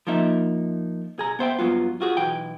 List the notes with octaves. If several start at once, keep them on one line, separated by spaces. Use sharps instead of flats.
F3 A#3 D#4 E5
B1 G#4 A#5
B3 C5 E5 G5
G2 F#3 B3 F4
F4 F#4 G#4
B1 E3 G5